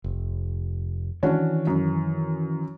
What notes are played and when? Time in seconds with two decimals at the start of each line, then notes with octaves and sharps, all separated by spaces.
0.04 F1
1.23 D#3 E3 C#4 D4 F#4
1.67 F#2